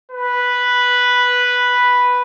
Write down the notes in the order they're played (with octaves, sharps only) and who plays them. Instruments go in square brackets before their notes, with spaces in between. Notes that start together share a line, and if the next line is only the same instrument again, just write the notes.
[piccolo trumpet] B4